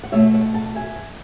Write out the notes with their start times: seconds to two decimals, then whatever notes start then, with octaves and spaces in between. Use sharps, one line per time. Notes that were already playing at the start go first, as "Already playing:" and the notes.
0.04 F#5
0.12 B2 A3 C#5 E5
0.34 D5 F#5
0.54 F#5 A5
0.76 E5 G#5